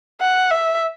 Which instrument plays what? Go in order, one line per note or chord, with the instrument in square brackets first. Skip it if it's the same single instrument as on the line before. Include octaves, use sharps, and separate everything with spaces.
[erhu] F#5
E5